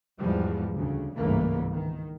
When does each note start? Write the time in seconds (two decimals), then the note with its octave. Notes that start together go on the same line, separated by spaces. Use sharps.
0.20 E2 G#2 F3 G3
0.77 D2 C#3
1.16 G1 C#2 G#2 E3 A3 A#3
1.72 D#3